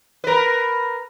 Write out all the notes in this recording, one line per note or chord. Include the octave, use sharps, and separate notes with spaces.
A#4 B4